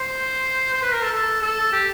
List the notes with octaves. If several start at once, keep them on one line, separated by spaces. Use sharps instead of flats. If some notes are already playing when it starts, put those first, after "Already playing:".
Already playing: C5
C5
B4
A#4
A4
A4
A4
G4